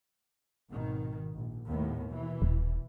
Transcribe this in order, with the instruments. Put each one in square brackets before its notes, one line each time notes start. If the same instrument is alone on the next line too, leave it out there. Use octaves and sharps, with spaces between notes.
[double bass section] G#1 B2 D#3
A#1
D#2 A2 B3
B2 E3
[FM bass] D#1